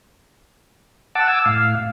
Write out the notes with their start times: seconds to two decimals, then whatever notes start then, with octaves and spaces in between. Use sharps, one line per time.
1.15 F#5 A5 D6 E6
1.28 G#5 D6 E6
1.46 A2 F5